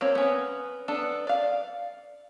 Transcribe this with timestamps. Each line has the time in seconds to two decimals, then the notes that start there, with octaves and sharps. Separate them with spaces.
0.01 A#3 C4 C#5
0.15 B3 C#4
0.88 B3 D4 A4
1.27 D5 F5